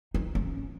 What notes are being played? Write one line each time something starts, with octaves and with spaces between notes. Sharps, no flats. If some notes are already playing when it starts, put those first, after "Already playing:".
D#4
C#4